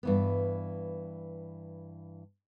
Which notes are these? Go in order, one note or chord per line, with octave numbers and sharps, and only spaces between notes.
G2 E3 B3